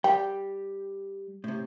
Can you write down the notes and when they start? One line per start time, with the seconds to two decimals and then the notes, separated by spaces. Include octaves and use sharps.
0.04 G3 G4 G5
1.44 A2 C3